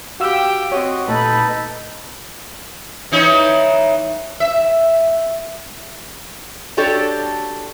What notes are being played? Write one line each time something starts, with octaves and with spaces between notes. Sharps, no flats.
F#4 G4 F5 G5 E6
C4 F#4 C#5 D#5
A#2 A3 D#4 A4 B4 B5
E3 D#4 C#5
E5
D4 F#4 G4 A4 C#5 D5